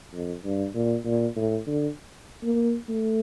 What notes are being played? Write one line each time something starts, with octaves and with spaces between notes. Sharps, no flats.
F2
G2
A#2
A#2
A2
D3
A#3
A3